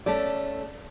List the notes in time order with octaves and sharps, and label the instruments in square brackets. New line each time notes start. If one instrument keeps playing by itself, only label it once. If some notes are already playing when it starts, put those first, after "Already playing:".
[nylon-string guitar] A3 C#4 A4 D5